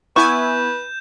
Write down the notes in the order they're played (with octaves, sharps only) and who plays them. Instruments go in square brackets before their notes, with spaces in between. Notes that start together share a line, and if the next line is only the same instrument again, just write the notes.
[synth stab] B3 E4 G#5 [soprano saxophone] B4 [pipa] C#6 [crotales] G6 E7